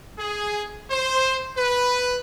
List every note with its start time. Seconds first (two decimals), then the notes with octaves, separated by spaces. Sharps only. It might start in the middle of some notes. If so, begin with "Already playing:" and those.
0.19 G#4
0.91 C5
1.57 B4